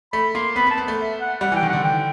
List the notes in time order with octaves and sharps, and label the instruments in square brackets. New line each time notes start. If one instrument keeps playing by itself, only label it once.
[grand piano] A3 [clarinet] B5
[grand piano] A#3 [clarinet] C6
[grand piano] B3 [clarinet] B5
[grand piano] B3
[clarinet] A5
[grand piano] B3
A3
[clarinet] E5
F#5
[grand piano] G3 [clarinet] F#5
[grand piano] E3
[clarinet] G5
[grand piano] D#3
[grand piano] D3 [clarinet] F#5
[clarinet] G5